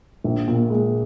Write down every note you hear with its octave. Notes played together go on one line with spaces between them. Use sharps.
A#1
A#2
G#3